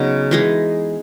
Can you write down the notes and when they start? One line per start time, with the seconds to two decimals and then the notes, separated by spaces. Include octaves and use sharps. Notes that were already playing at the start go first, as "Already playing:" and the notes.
Already playing: C#3 F#3 B3 D#4
0.31 E3 G#3 D#4 G#4